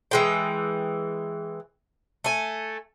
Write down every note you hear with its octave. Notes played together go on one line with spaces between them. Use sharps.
E3 G#3 G5
A3 G#5